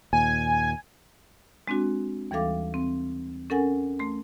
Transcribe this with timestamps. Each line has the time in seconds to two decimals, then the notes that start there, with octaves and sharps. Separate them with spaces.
0.13 D#2 A#2 G#5
1.68 G#3 C4 D4 F#4
2.31 D#2 E3 G3 A4 F5 D6
2.74 C4
3.50 C#4 A4 A#4 F#5 G#5
3.99 A3 C6